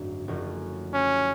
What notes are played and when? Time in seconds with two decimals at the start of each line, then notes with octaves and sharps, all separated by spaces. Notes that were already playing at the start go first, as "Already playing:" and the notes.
Already playing: G#1 F#2 D3 F#3 A3
0.28 F#1 F#2 F3 A3
0.93 C#4